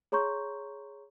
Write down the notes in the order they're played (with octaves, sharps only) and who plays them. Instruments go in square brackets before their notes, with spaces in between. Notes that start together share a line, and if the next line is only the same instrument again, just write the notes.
[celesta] G#4 C#5 A#5 C6 C#6 G6